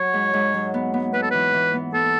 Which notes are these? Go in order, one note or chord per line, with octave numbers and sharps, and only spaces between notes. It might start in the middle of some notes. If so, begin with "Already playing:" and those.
Already playing: F#3 C#5
G#2
G#2
F#3
B3
B3
B3 B4
A4
E3 B4
E3
B3
B3 A4